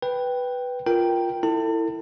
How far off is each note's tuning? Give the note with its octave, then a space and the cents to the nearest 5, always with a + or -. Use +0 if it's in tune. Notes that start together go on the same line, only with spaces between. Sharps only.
B4 +0 G5 +0
F4 +0 A#4 +0 G5 +0
E4 +0 A4 +35 A5 +35